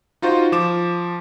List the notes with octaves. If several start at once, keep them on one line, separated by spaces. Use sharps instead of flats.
D#4 F4 F#4 C5
F3 D6 E7